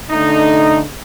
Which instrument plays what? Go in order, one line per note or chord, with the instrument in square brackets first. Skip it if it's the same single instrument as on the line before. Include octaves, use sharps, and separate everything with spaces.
[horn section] D3 A3 D#4